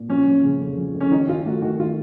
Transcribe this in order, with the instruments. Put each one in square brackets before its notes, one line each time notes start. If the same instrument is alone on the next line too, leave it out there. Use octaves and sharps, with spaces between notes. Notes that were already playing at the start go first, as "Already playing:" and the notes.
Already playing: [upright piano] A#2
[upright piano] F3 [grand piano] C#4
[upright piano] F3
C#3
F1
F3
F1
[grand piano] C#4
[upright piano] D#3 [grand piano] D#4
[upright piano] D#3 [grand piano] F4
[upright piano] A3 [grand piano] F#4
[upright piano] D#3 [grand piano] F#4
[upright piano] D#3 [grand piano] F4